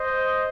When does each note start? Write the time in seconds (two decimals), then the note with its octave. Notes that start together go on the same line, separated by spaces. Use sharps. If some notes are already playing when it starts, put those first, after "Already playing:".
Already playing: C5 D#5